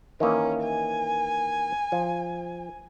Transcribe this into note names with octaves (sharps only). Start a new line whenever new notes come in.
D#3 E3 A#3 C#4
G#5
F3